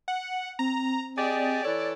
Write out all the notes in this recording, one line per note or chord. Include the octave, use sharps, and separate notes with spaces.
F#5
C4 A#5
G4 G#4 D5 D#5
E3 A4 C#5